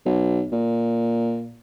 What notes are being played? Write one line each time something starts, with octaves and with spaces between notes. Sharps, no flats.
B1
A#2